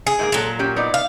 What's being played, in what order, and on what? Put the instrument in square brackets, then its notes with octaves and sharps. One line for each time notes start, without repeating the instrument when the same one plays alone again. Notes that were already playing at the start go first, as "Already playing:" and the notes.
[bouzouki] G#4
[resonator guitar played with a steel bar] G#2 A3 A#3
[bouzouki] A#2 F#3 [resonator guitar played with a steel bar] G#3 A4
[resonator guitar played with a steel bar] C#4 G4
B3 D#4 D5
[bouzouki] F5